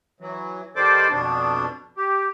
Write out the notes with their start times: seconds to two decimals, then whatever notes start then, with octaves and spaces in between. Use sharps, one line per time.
0.20 E3 F#3
0.76 D#3 G3 A4 C5 D5 D6
1.12 F2 B2 B3 D4
1.97 G4